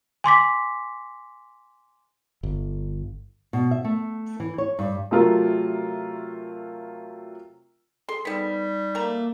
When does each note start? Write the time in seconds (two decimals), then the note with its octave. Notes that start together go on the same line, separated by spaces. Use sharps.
0.24 G#5 C6 D6 B6
2.43 G1
3.53 B2
3.71 E5
3.84 A3
4.40 E3
4.58 C#5
4.79 G2
5.11 C3 F#3 A3 F4 A#4
8.09 G#4 A4 C6
8.25 G3 B3 C4 D#4 B6
8.95 A3 A#3 A#5